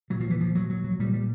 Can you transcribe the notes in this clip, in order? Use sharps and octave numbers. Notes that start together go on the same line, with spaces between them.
A#2 F#3
F3
E3
F3
F#3
F#3
F#3
A#2 G3
G3